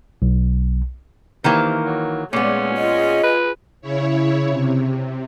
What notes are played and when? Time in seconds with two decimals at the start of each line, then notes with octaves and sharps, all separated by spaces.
0.22 B1
1.44 C3 D#3 E3 A#3
1.85 F#3
2.33 A#2 G#3 A3 B3 C#4
2.77 F4 G#4 D#5
3.23 B4
3.82 C#3 E4 C#5
4.50 C3